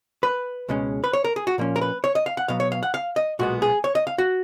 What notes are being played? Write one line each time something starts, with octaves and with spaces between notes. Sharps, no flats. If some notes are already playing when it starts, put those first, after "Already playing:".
B4
C#2 B2 G#3 C#4
B4
C#5
A#4
G#4
F#4
A#2 F3 A#3 C#4
A#4
B4
C#5
D#5
F5
F#5
B2 F#3 B3 F5
C#5
F5
F#5
F5
D#5
B1 A#2 G#3 B3 F#4
G#4
C#5
D#5
F5
F#4